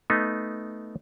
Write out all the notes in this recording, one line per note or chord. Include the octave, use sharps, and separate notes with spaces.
A3 B3 D#4